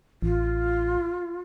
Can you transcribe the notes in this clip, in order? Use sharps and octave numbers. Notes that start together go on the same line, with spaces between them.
A1 F4